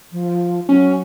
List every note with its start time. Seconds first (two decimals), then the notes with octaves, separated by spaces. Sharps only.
0.12 F3
0.69 F#3 C#4